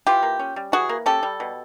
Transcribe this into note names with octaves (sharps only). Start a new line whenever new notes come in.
E3 F4 G4
A#3
C#4
G3
E3 F#4 G#4
A#3
C#4 G4 A4
G3
B2